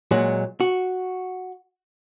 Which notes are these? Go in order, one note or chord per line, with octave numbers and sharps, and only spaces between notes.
A#2 F#3 G#3
F#4